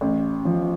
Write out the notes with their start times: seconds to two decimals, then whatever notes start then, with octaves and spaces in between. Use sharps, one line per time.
0.01 A1
0.45 F3